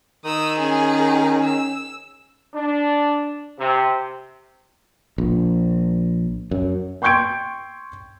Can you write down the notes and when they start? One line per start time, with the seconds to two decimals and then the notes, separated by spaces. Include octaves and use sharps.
0.25 D#3 D#6 E6
0.59 C#4 G#4 G#5
1.45 E6
2.54 D4
3.59 C3
5.18 A#1
6.51 F#2
7.02 G5 C6 C#6 G6 G#6 D7